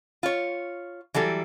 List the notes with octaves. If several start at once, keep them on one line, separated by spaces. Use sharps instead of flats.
F4 C#5
E3 F#3 G3 A4